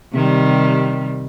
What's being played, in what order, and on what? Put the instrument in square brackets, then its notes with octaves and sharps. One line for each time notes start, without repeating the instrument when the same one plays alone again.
[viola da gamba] C3 D#3 G3